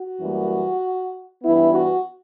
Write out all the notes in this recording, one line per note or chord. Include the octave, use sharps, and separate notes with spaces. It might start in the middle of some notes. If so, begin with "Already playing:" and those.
Already playing: F#4
F#2 E3 G3 A#3
G2 E3 B3 E4
F#4